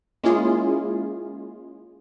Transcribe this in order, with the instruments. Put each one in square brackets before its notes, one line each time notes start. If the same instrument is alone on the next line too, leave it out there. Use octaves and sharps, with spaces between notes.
[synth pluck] G#3 A#3 C#4 E4 F4 G#4